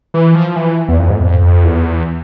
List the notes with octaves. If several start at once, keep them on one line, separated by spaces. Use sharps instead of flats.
E3
F3
E3
E2
F2
G#2
F2
F2
E2